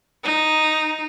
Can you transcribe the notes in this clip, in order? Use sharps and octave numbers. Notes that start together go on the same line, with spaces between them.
D#4